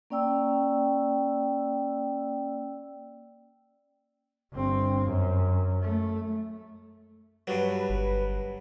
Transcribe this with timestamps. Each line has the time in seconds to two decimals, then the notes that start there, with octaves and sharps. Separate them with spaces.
0.10 A#3 C#4 D5 G5 E6
4.53 G1 C4
5.05 F#2
5.82 A3
7.47 G2 F#3 B4
7.89 G1